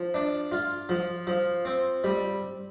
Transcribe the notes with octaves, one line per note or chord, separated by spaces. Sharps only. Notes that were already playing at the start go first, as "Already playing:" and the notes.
Already playing: F3
D4
F4
F3
F3
C4
G3